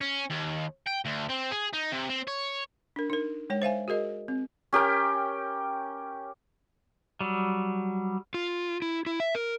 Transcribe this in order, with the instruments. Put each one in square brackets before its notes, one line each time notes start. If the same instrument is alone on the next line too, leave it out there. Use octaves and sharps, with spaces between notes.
[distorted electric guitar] C#4
D#2
G5
D2
C4
G#4
D#4
C3
C4
C#5
[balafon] D4 A#4
D#4 A#4
G#3 C#5 G5
C5 E5 F5 G#5
F#4 G#4 A#4 D#5
C4
[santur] C#4 G4 A#4 G5
[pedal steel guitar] F#3 G3
[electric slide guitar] F4
E4
E4
E5
A#4